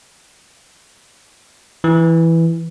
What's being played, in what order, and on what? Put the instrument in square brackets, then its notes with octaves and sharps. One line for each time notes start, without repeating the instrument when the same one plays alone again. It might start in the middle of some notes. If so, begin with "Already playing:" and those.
[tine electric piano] E3